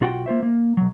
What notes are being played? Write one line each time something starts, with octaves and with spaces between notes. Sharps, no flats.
B1 F4 F#4 F#5 G5
A#3 F4 C5 E5
A#3
B1 F#3